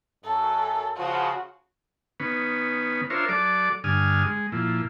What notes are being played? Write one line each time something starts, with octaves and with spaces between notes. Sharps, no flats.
F#2 A4
C#3 F3 F#4
D#3 B3 C#4 B4
D4 F4 A#4 C5 C#5 E5
F#3 A4 D5 D6
G2 D3 G#5 D#6 F6
G#3
A#2 F3 E4